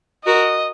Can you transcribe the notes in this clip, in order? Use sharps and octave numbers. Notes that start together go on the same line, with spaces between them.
F#4 A#4 D#5